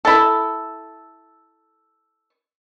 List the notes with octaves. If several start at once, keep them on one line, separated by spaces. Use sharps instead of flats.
E4 A4